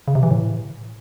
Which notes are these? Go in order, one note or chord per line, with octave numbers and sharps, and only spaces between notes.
C#3
C3
E3
A2